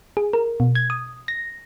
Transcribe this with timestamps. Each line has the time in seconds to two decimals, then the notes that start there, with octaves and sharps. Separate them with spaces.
0.17 G#4
0.33 A#4
0.60 B2
0.75 G#6
0.90 D#6
1.28 A#6